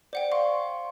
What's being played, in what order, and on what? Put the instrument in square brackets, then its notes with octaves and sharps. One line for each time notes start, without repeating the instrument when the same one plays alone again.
[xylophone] C5 F#5 G5 [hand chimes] D5
[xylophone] F5 [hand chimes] C6 C#6